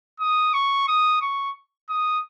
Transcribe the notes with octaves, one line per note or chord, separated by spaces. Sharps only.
D#6
C#6
D#6
C#6
D#6